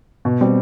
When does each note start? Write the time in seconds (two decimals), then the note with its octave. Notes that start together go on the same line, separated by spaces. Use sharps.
0.25 B2
0.41 G3 C4